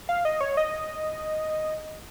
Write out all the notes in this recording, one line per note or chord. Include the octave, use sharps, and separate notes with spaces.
F5
D#5
C#5
D#5